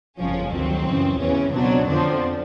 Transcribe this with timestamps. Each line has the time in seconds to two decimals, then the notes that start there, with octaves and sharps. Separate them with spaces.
0.19 G1 F2 C#3 F3 C#4
0.52 D2 C3 D#3 F#3 C4
0.86 F#2 C#3 E3
1.20 E2 C#3 E3 C#4
1.52 C#2 B2 F#3 C4 D4
1.86 F2 D3 F3 C4 D4